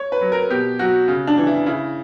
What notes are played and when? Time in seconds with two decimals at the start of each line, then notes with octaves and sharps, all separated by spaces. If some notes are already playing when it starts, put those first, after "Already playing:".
Already playing: C#5
0.12 B4
0.21 F#3
0.32 A#4
0.50 B2 G4
0.79 F#3 F#4
1.08 C#3
1.27 D4
1.38 E3
1.47 E4
1.66 C#3 E4